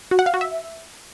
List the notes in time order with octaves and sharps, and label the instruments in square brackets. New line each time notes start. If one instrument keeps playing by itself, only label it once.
[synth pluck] F#4
F#5
F5
F#4
E5